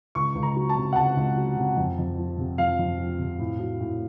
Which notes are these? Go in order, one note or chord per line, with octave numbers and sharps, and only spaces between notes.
C#2 C#6
C#2
A#5
F#3
A5
C3
F#5
C#2 A5
C#2
F#3
C3
F2
F2
F3
C3
F2 F5
F2
F3
C3
A2
F#3
A2